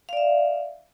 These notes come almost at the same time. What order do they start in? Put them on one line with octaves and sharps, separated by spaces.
F5 D5 E5